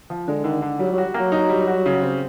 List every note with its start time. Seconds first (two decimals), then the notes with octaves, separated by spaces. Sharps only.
0.10 F3
0.28 D3 G#3
0.44 D3 D#3
0.62 D3
0.79 F#3 G3
0.92 F#3
0.98 F#4
1.14 A#3
1.20 F#3
1.32 D#4
1.49 G3
1.68 F#4
1.86 C#3
2.02 C4